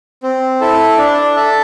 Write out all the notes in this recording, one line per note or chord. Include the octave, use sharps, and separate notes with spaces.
C4
E4 A4
D4
A4 E5 A5